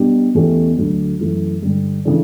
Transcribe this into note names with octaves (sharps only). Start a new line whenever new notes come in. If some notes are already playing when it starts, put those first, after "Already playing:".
Already playing: B2 G3 D4 G4
E2 B2 A3 C#4 G4
D2 D3 F#3 A3 D4
F#2 E3 A3
G2 D3 G3
C#3 E3 A3 D4